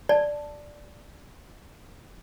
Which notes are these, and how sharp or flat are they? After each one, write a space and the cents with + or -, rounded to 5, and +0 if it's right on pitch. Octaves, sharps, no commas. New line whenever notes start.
D5 +0 A5 +0